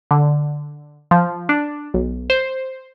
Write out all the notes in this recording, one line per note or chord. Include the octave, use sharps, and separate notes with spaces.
D3
F3
D4
B1
C5